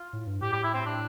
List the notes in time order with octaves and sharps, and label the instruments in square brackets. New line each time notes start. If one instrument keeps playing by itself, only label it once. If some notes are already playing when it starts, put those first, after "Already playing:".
Already playing: [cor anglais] F4
[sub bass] A2
G2
[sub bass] A2 [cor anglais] G4
[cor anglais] G4
E4
C4
D4